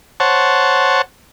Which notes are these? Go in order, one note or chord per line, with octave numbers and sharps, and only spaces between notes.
C5 C#5 F#5 A5